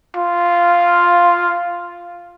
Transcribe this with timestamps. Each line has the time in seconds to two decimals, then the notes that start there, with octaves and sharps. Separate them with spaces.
0.16 F4